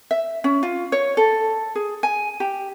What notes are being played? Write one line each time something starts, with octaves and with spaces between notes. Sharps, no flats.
E5
C#4
F4
C#5
A4
G#4
G#5
G4